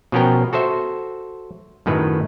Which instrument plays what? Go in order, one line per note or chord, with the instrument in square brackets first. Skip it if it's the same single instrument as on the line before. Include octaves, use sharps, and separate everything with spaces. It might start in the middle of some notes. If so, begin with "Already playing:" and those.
[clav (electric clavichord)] B2 F3 B3 C#4 A#4 G5
F#4 A4 C5 E5
F#2 A2 D#3 B4